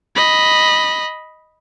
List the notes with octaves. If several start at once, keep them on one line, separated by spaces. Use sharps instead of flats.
D#5 B5